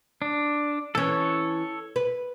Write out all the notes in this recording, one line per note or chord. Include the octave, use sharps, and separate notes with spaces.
D4
E3 C#4 A4 C#5
B4